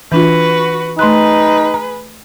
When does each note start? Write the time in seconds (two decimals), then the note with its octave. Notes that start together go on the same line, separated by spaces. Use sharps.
0.12 E3 D4 F4 F#4 B4
0.99 A3 D#4 G#4 B4 C6 F#6
1.74 A#5